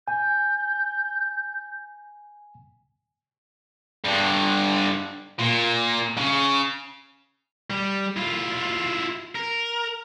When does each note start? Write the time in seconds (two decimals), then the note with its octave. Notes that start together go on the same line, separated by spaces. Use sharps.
0.08 G#5 G6
4.05 G2 D3
5.39 A#2
6.17 C#3
7.70 G3
8.17 E4 F4
9.35 A#4